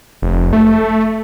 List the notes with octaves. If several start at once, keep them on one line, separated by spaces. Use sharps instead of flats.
F1
A3